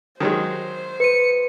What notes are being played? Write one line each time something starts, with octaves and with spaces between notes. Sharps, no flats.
D#3 F#3 G#3 C5
B4 C#7 D#7